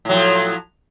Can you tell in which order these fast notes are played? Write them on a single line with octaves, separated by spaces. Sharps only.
A2 F#3 F3